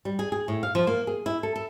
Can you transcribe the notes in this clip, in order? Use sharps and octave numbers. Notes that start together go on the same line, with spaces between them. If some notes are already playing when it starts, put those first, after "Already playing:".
G3
G#4
G#4
A2
F5
F3
A#3
G#4
E4
A4
A4